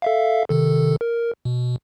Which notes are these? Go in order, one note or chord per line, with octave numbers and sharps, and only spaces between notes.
A4 E5 F5
C3 D#3 A4
A#4
B2